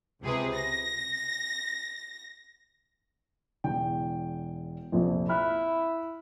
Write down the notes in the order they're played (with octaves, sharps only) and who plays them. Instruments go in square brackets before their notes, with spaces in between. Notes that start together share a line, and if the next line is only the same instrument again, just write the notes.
[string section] C#2 C3 G#4 B4
A#6
[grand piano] E1 E2 G5
A#1 F2 C3
[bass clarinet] E4 [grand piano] B5 F6 F#6